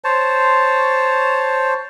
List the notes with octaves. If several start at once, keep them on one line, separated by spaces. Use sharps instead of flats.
C5 C#5 A5